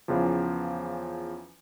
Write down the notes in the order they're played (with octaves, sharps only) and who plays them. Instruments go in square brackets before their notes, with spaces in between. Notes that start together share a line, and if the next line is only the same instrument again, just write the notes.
[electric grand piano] E2 C#3 E3 F3